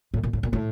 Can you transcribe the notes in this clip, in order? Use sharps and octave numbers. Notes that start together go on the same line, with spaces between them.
A2
A#2
A2
A#2
A2